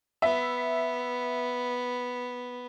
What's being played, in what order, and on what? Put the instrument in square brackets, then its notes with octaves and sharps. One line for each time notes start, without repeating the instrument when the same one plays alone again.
[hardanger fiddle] B3 [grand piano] E5